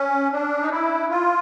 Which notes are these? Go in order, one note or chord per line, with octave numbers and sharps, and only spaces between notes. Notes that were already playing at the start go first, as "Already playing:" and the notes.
Already playing: C#4
D4
D#4
E4
F4